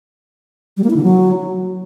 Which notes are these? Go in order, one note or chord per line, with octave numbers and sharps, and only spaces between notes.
G3
A#3
E4
D3
F#3